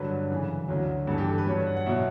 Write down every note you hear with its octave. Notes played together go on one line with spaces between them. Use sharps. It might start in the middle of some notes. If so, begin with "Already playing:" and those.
Already playing: G2 D3 F#3 B4
F#2 C#3 E3
D2 D3 F#3
G2 E3 A4
G4
A4
B4
G2 F#3 C#5
F#5
F#5
B2 F#3 E5